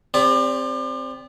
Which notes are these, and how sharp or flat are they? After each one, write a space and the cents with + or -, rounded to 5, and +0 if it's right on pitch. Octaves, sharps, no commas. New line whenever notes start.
C4 +0 G4 +35 D5 -25